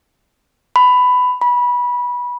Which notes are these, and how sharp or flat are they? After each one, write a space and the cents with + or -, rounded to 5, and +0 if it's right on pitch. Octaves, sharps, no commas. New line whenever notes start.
B5 +15
B5 -20